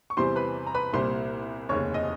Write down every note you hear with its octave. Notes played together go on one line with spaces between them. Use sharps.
C#6
E2 C3 E3 G3 C5 C6
B4 B5
A#5
B4 B5
C2 A#2 G3 C5 C6
F1 D#2 C#3 C#5 C#6
D#5 D#6